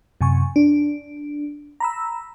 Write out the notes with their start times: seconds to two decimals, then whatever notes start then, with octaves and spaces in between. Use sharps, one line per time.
0.21 F#2 C3 G#5 C#6
0.56 D4
1.80 A#5 B5 E6